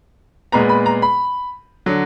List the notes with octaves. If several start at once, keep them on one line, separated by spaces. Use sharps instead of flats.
A#2 G#3 B3 A#5
B5
A#5
B5
D3 F#3